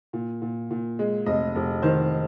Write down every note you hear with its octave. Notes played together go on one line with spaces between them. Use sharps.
A#2
A#2
A#2
G#3
F1 D#5
F1
D#3 C5